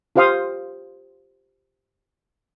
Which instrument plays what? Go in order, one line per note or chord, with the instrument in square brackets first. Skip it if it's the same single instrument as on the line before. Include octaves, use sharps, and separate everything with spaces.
[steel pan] F4 G4 C5 F5 C6 D#6